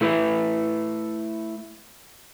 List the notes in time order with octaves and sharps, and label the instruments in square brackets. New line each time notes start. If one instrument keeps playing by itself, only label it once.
[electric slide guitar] A3 E4 B4